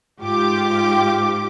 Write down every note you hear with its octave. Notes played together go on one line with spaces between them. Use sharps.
G#2 F4 G4 D6